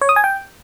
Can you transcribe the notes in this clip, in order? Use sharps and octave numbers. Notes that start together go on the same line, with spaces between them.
C#5
D#6
G#5
G5